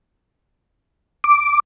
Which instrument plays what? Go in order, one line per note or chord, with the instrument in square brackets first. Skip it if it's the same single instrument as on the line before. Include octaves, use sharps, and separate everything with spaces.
[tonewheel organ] D6